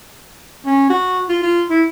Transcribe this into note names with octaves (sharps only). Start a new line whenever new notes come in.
C#4
F#4
F4
F4
E4